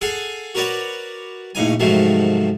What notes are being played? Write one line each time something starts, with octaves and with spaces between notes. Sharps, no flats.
G#4 A4 F5 F#5 G#5
F#4 A#4 B4 C#5 D5 F#5
A#1 A2 C#3 D#4 G#5
G#2 C3 D#3 F3 F#3 A3